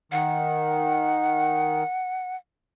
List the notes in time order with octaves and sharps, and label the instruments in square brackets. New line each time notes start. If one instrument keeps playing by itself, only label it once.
[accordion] D#3 [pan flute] F#5